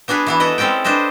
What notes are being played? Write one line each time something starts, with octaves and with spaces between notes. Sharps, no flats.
B3 D4 F#4 G#4 B4
E3 B3 E4
E4 A4 B4 D#5
G#3 C4 C#4 A4 G5
D4 B4 C5 D#5 E5